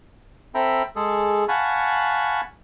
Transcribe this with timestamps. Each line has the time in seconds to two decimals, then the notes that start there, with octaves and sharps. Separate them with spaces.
0.55 C4 A4 E5 G5 A#5 B5
0.96 G#3 G#4 A4
1.48 F5 F#5 G#5 A5 B5 C#6